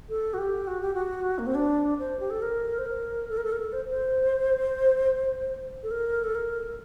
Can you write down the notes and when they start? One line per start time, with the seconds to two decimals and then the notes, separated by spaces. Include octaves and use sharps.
0.09 A4
0.34 F#4
0.38 G4
0.67 F#4
0.81 G4
0.94 F#4
1.38 A#3
1.47 C4
1.55 D4
1.99 C5
2.20 G4
2.30 A4
2.42 A#4
2.78 C5
2.86 A#4
3.29 A4
3.37 A#4
3.44 A4
3.52 A#4
3.60 A4
3.73 C5
3.89 C5
5.83 A4
5.91 A#4
6.24 A4
6.35 A#4